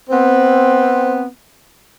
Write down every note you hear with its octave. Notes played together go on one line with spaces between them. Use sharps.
B3 C4